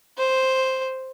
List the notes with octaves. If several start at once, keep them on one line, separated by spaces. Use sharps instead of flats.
C5